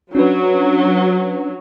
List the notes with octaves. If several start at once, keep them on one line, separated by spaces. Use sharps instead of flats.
F#3 C#4 D4 B4